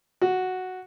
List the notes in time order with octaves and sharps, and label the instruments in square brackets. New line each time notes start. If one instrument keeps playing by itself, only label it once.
[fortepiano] F#4